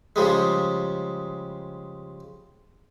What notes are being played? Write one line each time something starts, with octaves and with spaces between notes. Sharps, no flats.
C#3 F3 G3 G#3